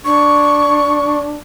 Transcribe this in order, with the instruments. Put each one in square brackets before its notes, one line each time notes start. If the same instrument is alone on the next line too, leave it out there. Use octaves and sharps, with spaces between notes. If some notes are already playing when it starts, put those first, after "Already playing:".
[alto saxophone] D4 [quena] C#6